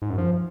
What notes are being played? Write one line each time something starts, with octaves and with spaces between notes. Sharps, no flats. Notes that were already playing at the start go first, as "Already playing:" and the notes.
G#2
F#2
F3